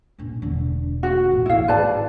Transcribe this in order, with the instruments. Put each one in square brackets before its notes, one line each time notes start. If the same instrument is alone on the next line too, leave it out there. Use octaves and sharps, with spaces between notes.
[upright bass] A#1 C#4
E1 D3
[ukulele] F#4
[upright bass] A#1 A2
[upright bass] A1 E2 [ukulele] E4 F5
[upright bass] G#1 [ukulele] B4 D5 A5